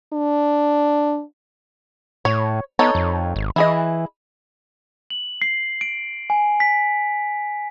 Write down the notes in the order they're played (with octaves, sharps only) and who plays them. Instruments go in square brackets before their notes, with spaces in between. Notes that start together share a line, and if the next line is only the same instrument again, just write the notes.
[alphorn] D4
[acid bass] A2 [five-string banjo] C#5
[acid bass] B3 [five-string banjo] D#4 A4 C#5
[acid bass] F2
G#1
[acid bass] E3 [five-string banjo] E4 G#4 D#5
[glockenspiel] F#7
C7
D7
G#5
B6